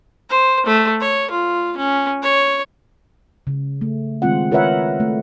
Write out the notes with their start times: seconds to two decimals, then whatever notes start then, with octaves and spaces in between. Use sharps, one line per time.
0.30 C5
0.66 A3
1.01 C#5
1.31 F4
1.77 C#4
2.23 C#5
3.47 C#3
3.81 A3
4.22 D#3 G#3 C4 F4 F#5
4.51 F4 A#4 B4 C#5 E5 F#5
5.00 A3